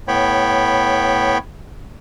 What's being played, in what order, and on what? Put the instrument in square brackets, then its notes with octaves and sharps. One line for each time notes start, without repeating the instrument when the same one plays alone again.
[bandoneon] A2 B3 C#5 G5 B5